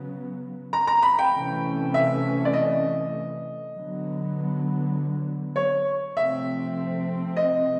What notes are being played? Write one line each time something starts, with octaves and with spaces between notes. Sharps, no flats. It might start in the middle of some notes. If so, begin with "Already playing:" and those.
Already playing: C#3 F#3 B3
A#5
A#5
B5
G5
C3 E3 A3 C#4
E5
D5
D#5
D3 F#3 B3
C#5
C3 F3 A3 C4 E5
D#5